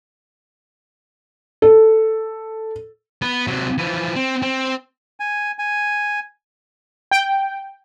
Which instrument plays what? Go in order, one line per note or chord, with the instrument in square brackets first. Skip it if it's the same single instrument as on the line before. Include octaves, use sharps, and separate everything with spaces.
[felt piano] A4
[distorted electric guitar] B3
C3 F#3
E3 F3
C4
C4
[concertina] G#5
G#5
[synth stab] G5